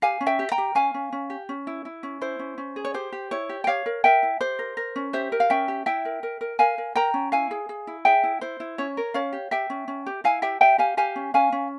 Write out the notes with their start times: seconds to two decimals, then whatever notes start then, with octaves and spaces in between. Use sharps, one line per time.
0.02 G4 F5 G#5
0.21 C#4
0.27 E5 G5
0.39 G4
0.52 G5 A#5
0.58 G4
0.75 C#4 F5 G#5
0.94 C#4
1.12 C#4
1.30 G4
1.49 C#4
1.67 E4
1.85 E4
2.03 C#4
2.21 E4 C5
2.39 C#4
2.58 C#4
2.76 G#4
2.85 C#5
2.94 G4 C5
3.12 G4
3.31 E4 C#5
3.49 G4
3.64 G5
3.67 G4 C#5 F5
3.86 A#4
4.04 A#4 E5 G5
4.23 E4
4.40 G4 C5
4.59 A#4
4.77 A#4
4.96 C#4
5.13 G4 C5 E5
5.32 A#4
5.40 F5
5.50 C#4 E5 G5
5.68 G4
5.86 E4 E5 G5
6.05 A#4
6.23 A#4
6.41 A#4
6.59 A#4 F5 G#5
6.78 A#4
6.95 A#4 G5 A#5
7.14 C#4
7.32 E4 F5 G#5
7.51 G#4
7.69 G#4
7.87 E4
8.05 G#4 E5 G5
8.23 E4
8.41 E4 C5
8.60 E4
8.78 C#4 C#5
8.97 A#4
9.14 C#4 C#5 F5
9.33 G4
9.51 G4 E5 G5
9.70 C#4
9.88 C#4
10.06 G4
10.24 E4 F5 G#5
10.42 G4 E5 G5
10.61 G4 E5 G5
10.78 G4 F5 G#5
10.97 G4 F5 G#5
11.16 C#4
11.34 C#4 F5 G#5
11.52 C#4